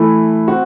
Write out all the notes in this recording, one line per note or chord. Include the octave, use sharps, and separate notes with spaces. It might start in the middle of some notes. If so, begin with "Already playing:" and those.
Already playing: E3 A3 E4
C4 F#4